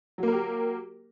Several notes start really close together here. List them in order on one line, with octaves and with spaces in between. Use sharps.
F#3 A#3 A#4 G4